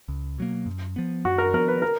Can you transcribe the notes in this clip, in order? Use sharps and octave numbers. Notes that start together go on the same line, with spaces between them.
C#2
B2 F#3 A#3
F#2
F3 B3
F#2 F#4
A#4
F3 B3 A#4
B4
A#4